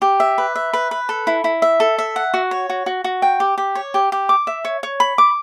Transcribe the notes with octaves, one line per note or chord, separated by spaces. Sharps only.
G4
E5
B4
E5
B4
B4
A4
E4
E4
E5
A4
E5
F#5
F#4
C#5
F#4
F#4
F#4
G5
G4
G4
C#5
G4
G4
D6
E5
C#5
C#5
B5
D6